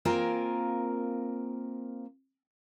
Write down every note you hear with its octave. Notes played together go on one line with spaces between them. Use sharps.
A#3 C4 F4 A#4 G#5